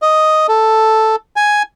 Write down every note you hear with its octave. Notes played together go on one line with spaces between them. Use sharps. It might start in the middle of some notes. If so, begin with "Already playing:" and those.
D#5
A4
G#5